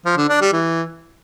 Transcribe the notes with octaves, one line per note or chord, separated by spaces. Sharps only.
F3
D3
D4
G3
E3